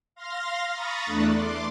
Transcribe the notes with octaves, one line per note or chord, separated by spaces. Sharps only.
F5 C6 F6 A#6
A#5 B5 C#6 D#6 A6
E2 A3 D4 F#6
C6 D6